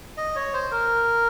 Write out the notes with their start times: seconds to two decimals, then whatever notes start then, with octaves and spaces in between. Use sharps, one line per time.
0.17 D#5
0.36 C#5
0.54 C5
0.71 A#4